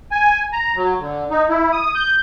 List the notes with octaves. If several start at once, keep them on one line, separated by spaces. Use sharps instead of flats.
G#5
A#5
F#3
D3
D#4
E4
D#6
G6